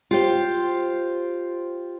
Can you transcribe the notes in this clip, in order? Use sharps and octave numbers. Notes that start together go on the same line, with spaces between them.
F4 G4 C5